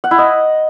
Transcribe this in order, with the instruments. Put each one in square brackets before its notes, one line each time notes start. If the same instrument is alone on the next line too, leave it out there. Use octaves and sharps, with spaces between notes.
[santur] F#5
E4
D#5